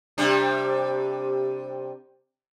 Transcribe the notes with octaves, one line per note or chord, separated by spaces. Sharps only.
C3 G3 D4